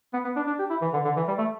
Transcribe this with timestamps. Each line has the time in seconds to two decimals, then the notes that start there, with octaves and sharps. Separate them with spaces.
0.13 B3
0.24 B3
0.36 D4
0.47 D4
0.59 G4
0.70 E4
0.82 E3
0.93 D3
1.05 D3
1.16 E3
1.28 G3
1.38 A3